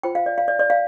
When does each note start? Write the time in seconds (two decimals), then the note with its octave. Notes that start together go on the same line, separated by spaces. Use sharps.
0.03 F4 C5 G5
0.15 F5
0.26 D5
0.38 F5
0.48 D5
0.59 D5
0.70 F5